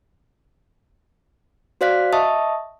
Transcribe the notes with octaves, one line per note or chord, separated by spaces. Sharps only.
F#4 C5 D5 F5 F#6 B6
D#5 E5 A5 C#6 D#6